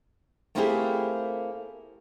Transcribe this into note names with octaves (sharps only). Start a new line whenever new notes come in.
A3 A#3 C4 E4 G4 G#4